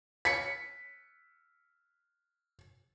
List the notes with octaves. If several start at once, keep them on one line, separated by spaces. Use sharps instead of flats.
B6 C#7